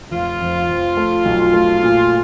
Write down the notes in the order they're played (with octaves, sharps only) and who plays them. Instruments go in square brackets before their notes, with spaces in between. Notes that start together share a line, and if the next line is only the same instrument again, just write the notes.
[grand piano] F1 [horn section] F4
[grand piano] F2
F2
A3
B1
A3
A#2